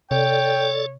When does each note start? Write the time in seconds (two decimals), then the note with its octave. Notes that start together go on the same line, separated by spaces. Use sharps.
0.11 C3 A4 C#5 D5 G5